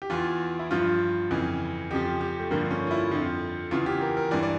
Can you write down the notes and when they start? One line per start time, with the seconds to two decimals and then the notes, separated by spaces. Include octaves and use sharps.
0.02 G4
0.10 E2 E3 F4
0.59 E4
0.71 G2 F3 F4
1.31 F2 C#3 E3
1.91 F2 C#3 F3 G4
2.21 G4
2.40 A3
2.51 G2 D3 F3 A#3
2.71 C#4
2.87 F4
2.91 E4
3.11 F2 D3 F3
3.71 E2 C#3 E3 F4
3.86 G4
4.01 A#4
4.17 A#4
4.31 G2 E3 D5
4.43 D5